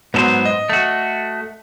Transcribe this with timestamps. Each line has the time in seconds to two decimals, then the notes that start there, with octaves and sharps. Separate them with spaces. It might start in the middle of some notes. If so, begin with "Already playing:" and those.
0.14 G#2 F#3 B3 A4 C5
0.45 D#5
0.70 A3 F#4